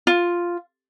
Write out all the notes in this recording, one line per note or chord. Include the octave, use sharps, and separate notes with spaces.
F4